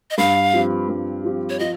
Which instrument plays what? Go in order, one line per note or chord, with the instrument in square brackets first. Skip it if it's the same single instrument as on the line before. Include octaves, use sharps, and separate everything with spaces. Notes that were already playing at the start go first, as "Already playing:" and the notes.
[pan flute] D#5
[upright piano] G2 [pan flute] F5
[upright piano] F3 C4 G4
G2
F3 C4 G4
[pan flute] C#5
[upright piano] F3 [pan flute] D#5